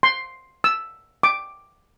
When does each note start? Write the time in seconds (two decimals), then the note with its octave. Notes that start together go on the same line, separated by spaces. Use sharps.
0.03 C6
0.64 E6
1.23 D6